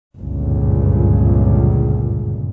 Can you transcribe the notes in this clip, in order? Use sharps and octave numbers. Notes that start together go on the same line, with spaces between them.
G1 C#2 F#2 A#2